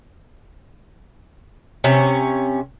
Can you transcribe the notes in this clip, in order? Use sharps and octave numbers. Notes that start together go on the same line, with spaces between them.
C3 C#4